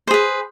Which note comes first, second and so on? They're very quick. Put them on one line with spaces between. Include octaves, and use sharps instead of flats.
C5 G#4 B4